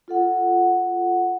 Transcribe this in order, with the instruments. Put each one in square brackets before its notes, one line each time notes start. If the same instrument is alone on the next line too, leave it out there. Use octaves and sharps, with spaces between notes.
[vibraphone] F4 A4 F#5